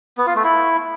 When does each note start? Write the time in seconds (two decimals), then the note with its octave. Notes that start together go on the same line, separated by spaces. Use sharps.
0.18 B3
0.27 F4
0.35 A3
0.44 E4